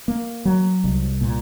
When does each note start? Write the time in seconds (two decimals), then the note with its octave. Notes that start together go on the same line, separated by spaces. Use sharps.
0.08 A#3
0.45 F#3
0.84 C2
1.21 A#2